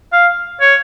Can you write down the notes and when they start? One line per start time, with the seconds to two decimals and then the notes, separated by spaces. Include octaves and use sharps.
0.12 F5
0.61 C#5